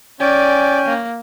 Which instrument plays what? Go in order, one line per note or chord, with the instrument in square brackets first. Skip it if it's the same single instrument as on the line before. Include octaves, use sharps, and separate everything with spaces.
[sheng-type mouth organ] C#4 G5 G#5 [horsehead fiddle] D5
[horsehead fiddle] A#3